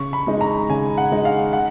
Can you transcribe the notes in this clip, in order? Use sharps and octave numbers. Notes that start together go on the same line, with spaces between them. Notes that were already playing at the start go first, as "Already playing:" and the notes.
Already playing: C#3 C#6
B5
G#3 D#4
A#5
C#3 G#5
F#5
G#3 D#4
F5
F#5